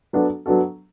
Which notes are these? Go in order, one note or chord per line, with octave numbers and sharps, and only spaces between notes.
F#3 B3 D4 F#4 A4
F#3 B3 D4 F#4 A4